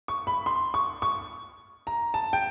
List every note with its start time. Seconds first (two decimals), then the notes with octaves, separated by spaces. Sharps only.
0.08 C#6
0.27 B5
0.46 C6
0.74 C#6
1.02 C#6
1.87 A#5
2.14 A5
2.33 G5